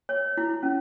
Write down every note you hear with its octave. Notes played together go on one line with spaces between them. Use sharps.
C#5
E4
C#4